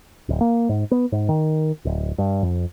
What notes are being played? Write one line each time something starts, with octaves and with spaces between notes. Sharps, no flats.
D1
A#3
G#2
B3
G#2
D#3
D1
G2
F2